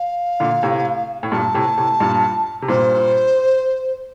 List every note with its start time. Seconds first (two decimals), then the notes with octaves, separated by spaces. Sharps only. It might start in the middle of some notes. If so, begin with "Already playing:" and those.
Already playing: F5
0.40 A#2 D3
0.63 A2 C3
1.23 A2
1.32 G2 A#2 A5
1.54 A2 C3
1.78 A2 C3
2.00 G2 A#2
2.62 C3
2.68 G2 A#2 C5